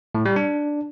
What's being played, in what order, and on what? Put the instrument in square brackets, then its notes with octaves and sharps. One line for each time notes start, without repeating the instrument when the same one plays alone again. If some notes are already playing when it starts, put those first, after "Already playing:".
[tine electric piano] A2
G3
D4